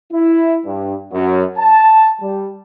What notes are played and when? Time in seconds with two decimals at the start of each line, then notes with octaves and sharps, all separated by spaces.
0.12 E4
0.65 G2
1.13 F#2
1.58 A5
2.21 G3